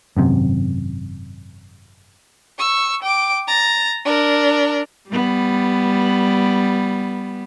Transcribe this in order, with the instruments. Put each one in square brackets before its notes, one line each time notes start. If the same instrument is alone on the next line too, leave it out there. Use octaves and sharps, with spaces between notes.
[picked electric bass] G#1 F#2 C3
[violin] C#6 E6
G5 D6
A#5 A6
D4 A#4
[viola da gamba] G3 B3